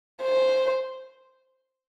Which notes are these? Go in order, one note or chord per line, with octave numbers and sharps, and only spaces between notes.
C5